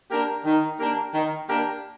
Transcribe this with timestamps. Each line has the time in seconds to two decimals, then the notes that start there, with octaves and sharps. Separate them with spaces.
0.10 A#3 D4 G4 A#4
0.45 D#3
0.79 A#3 D4 G4 A#4
1.14 D#3
1.48 A#3 D4 G4 A#4